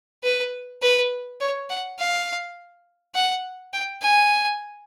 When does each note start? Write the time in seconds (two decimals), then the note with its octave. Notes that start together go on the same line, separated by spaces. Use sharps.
0.24 B4
0.82 B4
1.41 C#5
1.70 F#5
1.99 F5
3.15 F#5
3.73 G5
4.02 G#5